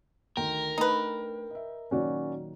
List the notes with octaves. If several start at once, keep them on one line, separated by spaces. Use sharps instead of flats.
D2 D#3 A#4 G5 C6
A3 D4 D#4 B4
D#5 E5
A#2 D#3 F#3 C#4 F#4 D5